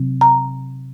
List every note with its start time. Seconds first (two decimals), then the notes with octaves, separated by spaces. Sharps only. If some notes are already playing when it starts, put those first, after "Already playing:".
Already playing: C3 F#3 C4
0.21 A#5